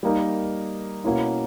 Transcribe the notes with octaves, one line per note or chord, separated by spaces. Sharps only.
G3 A#3 D#4 A#4
B2 A#3 C#4 E4